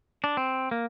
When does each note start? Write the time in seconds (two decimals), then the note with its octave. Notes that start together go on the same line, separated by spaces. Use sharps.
0.24 D4
0.37 C4
0.71 A#3